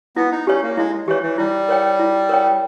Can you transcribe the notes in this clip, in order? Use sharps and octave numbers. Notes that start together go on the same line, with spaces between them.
B3 E4
D#4
C#4 G4 C#5
A#3
G#3 E4
E3 G4 C#5
E3
G3 E4
A#4 C#5 G5
E4
A#4 C#5 G5